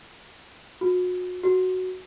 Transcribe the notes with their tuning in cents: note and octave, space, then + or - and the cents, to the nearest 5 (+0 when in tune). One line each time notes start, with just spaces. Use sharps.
F#4 -35
F#4 +0